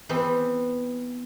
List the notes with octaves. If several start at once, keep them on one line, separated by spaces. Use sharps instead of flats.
E3 B3 C4 E5